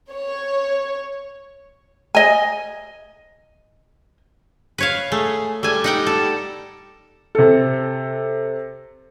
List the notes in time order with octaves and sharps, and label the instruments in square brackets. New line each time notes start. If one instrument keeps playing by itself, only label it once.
[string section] C#5
[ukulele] D#5 G#5
[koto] B4 C#5 F5
[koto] A3 [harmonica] G#4
[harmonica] G3 [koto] A3 G#5
[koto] D#4 F#5 G5
A4
[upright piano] C3 A4